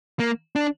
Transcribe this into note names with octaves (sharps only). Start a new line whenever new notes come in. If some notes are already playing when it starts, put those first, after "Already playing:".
A#3
D4